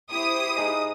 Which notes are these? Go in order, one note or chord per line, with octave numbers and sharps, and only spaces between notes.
E4 G4 C5 D#6
D#4 G#4 D#5